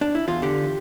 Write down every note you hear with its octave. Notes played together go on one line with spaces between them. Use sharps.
D4
E4
E2 F4
D3 G4